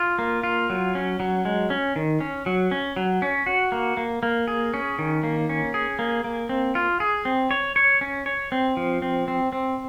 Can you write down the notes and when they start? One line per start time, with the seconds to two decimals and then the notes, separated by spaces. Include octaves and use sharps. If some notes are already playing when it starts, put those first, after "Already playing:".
Already playing: F4
0.19 A#3
0.43 F4
0.70 F#3
0.95 C#4
1.20 F#3
1.45 G#3
1.70 C#4
1.96 D#3
2.21 C#4
2.46 F#3
2.71 C#4
2.96 F#3
3.22 C#4
3.46 F#4
3.72 A#3
3.97 A#3
4.23 A#3
4.48 G#4
4.74 C#4
4.99 D#3
5.23 A#3
5.49 C#4
5.74 G#4
5.99 A#3
6.24 A#3
6.49 C4
6.75 F4
7.00 G#4
7.25 C4
7.51 C#5
7.76 C#5
8.01 C#4
8.26 C#5
8.52 C4
8.77 F3
9.02 C4
9.28 C4
9.52 C4